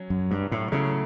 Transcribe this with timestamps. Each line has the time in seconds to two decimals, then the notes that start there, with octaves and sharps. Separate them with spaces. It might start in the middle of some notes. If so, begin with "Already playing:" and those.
Already playing: F#3 C#4
0.10 F#2
0.31 G2
0.52 A2
0.72 C#3 F#3 A3 E4